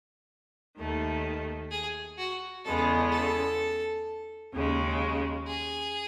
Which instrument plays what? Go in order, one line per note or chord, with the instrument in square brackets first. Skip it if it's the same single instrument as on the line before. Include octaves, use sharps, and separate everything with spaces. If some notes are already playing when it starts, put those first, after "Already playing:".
[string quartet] D#2 D#3 A3
[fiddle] G#4
F#4
[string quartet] E2 C#3 G#3 B3 [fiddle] A4
[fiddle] A4
[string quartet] D#2 C#3 G#3
[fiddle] G#4